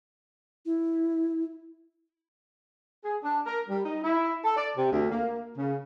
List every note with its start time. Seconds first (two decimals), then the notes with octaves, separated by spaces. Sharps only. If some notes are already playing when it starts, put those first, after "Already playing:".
0.66 E4
3.05 G#4
3.23 D4
3.46 A#4
3.69 G3
3.85 D#4
4.04 E4
4.44 A4
4.57 D5
4.77 C3
4.93 D2
5.11 A#3
5.56 C#3